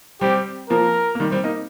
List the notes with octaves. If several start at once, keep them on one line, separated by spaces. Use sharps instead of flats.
G3 C4 G4
F3 A#3 A#4
A#3
D#3 G3
G3 C4
A#3 D#4